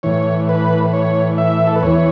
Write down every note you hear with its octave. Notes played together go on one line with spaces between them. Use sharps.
A2 E3 C#5
B4
C#5
E5
A4
B4
E2 E3 C#5